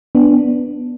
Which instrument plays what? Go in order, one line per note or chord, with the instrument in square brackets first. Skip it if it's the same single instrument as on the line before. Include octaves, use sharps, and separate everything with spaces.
[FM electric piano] B3 D4